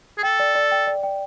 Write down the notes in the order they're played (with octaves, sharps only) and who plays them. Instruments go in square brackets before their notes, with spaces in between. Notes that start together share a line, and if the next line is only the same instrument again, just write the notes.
[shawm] G#4
[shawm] A4 [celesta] G5
[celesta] D5
D5
G5
D5
G5